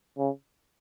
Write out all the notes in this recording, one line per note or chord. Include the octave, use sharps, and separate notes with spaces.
C#3